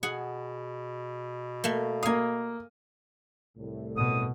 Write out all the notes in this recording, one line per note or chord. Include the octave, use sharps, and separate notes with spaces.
B2 G#4 F#5
A3 A#3
A#3 F5 G#5 D#6
C2 A2
B2 D#6